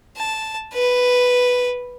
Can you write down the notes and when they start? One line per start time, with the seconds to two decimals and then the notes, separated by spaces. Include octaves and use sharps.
0.17 A5
0.74 B4